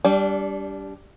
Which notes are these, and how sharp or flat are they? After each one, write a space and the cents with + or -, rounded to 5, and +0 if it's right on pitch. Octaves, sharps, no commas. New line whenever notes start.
G3 +0 D4 -25